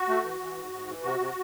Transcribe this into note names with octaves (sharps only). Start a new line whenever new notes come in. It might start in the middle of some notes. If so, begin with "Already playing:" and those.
Already playing: F#4
A3
E3
E3
G#2
G#2
E3
C3 F#4
C3